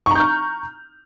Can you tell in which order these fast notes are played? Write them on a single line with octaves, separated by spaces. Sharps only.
C#6 A#5 G6 F6